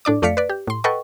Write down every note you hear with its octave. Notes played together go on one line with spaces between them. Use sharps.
A2 D4 D5 D6
F2 A3 D5 F5 B6 C#7
B4 D5
G4
A2 C6
A4 B4 D#5 F#5 G5 C#6